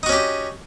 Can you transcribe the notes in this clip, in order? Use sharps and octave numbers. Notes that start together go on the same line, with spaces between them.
C#4 D#4 F#4 G4